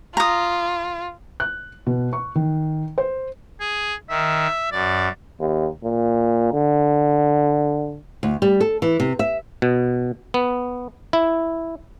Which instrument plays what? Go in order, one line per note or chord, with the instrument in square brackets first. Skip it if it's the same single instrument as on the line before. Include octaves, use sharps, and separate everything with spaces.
[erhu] F4 [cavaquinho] A#5 D#6
[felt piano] F#6
B2
C#6
D#3
C5
[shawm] G#4
[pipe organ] D#3 [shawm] E5
[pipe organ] F#2 [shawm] D5
[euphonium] D#2
A#2
D3
[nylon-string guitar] D2
G3
A4
E3
C3
E5
[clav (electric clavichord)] B2
B3
E4